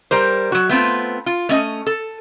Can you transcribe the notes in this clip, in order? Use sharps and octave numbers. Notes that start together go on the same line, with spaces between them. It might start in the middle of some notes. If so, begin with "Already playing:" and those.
G3 A#4 C5
F#3 F#4
A3 B3 C4 F4
F4
A3 C#4 D#5
A4